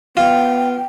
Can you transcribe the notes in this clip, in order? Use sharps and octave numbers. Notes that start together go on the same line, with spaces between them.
B3 F4 G5